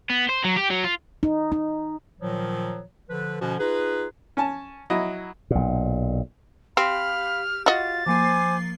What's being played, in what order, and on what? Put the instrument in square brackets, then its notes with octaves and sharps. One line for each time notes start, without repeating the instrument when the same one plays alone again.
[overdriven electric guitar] B3
C5
F#3
G4
F#3
F4
[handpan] D#4
D#4
[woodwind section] A#2 D#3 F3 F#3
D3 F3 B4
B2 D3 F3 C#4 F#4
D#4 F4 G#4 B4
[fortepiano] C#4 G#5 A5
F#3 E4 D#5
[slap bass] B1 A#2
[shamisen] C4 [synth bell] G4 [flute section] F5 B5 [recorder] F6
[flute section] F4 [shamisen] F#4 D#5 [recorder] A6
[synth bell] F3 A#3 C7 [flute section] C5 G#5 D6